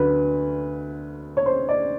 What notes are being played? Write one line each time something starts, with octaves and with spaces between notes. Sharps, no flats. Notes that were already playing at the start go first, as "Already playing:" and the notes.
Already playing: D2 D3 F#3 B4
C#5
C5
D5